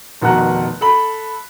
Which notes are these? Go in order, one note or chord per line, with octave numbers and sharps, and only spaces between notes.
F1 B2 D#3 F#5 A#5 F#6
A4 B5